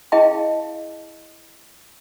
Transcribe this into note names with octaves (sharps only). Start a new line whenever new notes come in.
E4 G#4 D#5 F5 G5 A5